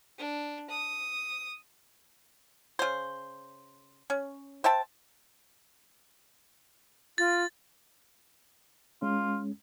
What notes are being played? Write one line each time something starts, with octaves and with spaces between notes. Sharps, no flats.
D4
D#6
C#3 C5
C#4
C5 E5 G5 A5
F4 A6
G#3 C#4 F4